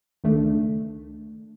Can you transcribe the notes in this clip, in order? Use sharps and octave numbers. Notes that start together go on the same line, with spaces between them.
C#2 D#3 A3 D4 A4